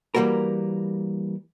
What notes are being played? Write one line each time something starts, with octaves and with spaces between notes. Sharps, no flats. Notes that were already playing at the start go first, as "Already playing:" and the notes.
E3 G3 A#3 F#4 A#4